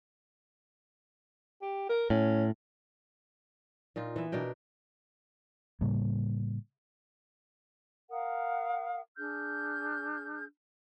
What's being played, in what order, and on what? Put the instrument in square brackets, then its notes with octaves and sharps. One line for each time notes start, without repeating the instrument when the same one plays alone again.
[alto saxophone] G4
A#4
[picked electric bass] A2 [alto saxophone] C#4
[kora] A#2 D#4 F4
E3 B3 E5
B2 D4 A#4 G5
[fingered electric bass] A2 C#3 G3 A#3
[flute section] A#4 F5 F#5 D#6
D4 G#4 F6 G6